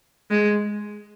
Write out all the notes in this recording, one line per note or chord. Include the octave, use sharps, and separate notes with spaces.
G#3